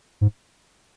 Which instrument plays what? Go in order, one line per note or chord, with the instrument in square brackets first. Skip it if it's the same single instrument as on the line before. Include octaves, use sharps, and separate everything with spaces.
[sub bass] G#2